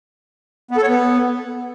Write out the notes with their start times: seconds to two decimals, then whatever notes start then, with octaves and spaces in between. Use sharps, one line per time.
0.71 B3
0.77 A4
0.83 C#5
0.89 B3